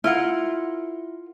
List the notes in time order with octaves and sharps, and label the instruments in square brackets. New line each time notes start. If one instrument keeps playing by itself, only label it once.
[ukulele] E4 [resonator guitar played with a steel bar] F4 A#4 F#5